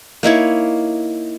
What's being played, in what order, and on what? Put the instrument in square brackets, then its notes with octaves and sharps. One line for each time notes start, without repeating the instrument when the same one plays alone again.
[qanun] A#3 D#4 E4 C#5